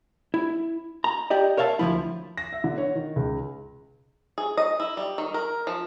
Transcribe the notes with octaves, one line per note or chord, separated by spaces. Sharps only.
E4
A#5
G4 D5 D#5
A#4 C#5 E5 F5 A5
D2 C#3 F3 E4
A#6
E5
D3
C#5
D#3
C#2
G#4
D#5
E4
G3
D#3
A#4
F3